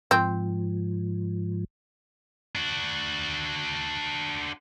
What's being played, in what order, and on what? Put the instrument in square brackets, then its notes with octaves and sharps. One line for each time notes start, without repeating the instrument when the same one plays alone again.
[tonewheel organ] G#2 F3 [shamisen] C4
[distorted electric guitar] D4 F#4